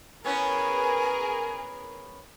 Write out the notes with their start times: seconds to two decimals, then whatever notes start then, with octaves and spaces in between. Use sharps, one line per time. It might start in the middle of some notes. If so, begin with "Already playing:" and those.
0.25 B3 C#4 E4 G#4 A#4 B4 G#5